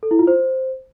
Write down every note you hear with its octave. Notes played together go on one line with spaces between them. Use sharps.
A4
E4
F4
C5